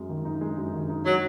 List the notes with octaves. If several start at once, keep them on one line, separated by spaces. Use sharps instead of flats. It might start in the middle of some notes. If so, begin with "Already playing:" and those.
Already playing: F#2 G#3
D#3
D#4
G#3
F#2
D#3
D#4
F#3 G#3